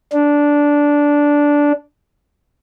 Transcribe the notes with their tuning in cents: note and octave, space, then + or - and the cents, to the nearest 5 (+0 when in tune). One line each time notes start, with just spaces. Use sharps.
D4 -10